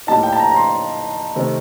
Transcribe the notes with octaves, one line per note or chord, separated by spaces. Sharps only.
A2 G3 A#3 D#4 A5
G5
A5
A#5
A#5
C6
C3 D#3 A3 C4 D#4